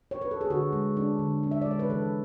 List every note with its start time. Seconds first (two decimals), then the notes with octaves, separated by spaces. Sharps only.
0.11 C#5
0.21 B4
0.31 A4
0.41 G#4
0.50 D3 F#4
0.73 G#3
0.97 D4
1.19 D3
1.43 D4
1.51 E5
1.62 D5
1.66 G#3 C#5
1.79 B4
1.90 E3 A4